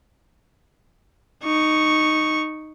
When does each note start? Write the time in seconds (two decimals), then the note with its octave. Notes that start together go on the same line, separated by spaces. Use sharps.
1.44 D#4 C#6